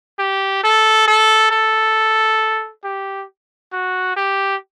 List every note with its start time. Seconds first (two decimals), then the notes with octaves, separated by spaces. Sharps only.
0.19 G4
0.63 A4
1.07 A4
1.51 A4
2.84 G4
3.73 F#4
4.16 G4